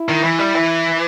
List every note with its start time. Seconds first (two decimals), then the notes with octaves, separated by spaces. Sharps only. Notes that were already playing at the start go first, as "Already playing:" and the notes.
Already playing: E4
0.09 D#3
0.23 E3
0.39 G3
0.55 E3